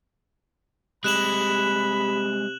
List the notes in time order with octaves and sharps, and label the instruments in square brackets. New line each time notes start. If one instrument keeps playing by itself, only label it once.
[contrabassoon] C3 [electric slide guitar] G3 G#3 [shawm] B5 [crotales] F#6 E7 F#7